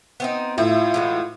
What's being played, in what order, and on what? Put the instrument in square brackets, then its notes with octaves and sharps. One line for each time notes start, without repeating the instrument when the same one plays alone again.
[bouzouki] B3 C4 D#4
[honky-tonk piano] A2 [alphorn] F4 [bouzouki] E5
[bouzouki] E3 G#3 F#4